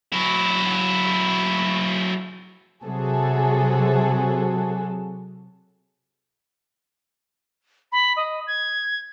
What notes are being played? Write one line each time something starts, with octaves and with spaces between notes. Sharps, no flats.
F#3 E4
C3 F#3 F#4 G#4 A4
B5
D#5
G#6